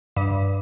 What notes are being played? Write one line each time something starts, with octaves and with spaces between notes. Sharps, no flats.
G2